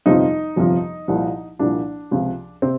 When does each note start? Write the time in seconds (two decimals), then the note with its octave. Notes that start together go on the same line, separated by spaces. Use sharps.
0.06 G1 F2 C3 F3 D#4
0.56 G1 F2 C3 F3
1.08 C2 A#2 F3
1.59 C2 A#2 F3 D4
2.11 C#2 C3 F3
2.62 C3 C4